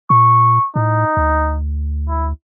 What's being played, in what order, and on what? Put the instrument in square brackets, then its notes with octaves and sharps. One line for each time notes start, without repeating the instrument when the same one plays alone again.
[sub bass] A#2 [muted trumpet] C#6
[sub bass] A2 [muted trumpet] D#4
[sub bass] D2
[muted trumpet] E4